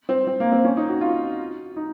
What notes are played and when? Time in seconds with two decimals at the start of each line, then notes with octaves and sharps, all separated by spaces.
0.09 C4
0.27 C4
0.40 A#3
0.52 C4
0.64 C#4
0.77 D#4
0.89 F#4
1.01 F4
1.76 D#4